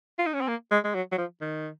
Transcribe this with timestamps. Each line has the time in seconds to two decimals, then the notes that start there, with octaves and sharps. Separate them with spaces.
0.19 F4
0.26 D#4
0.34 C#4
0.41 C4
0.48 A#3
0.71 G#3
0.85 G#3
0.95 F#3
1.12 F#3
1.18 F3
1.41 D#3